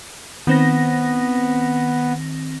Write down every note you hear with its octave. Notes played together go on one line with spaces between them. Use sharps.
D#3 B3 C4 A#6